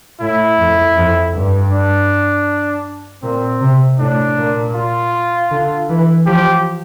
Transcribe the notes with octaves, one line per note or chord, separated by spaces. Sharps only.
A2 E4
F2
F2
G2
D4
A#2 C4
C3
A2 D4
A#2
F4
D3
E3
F3 G4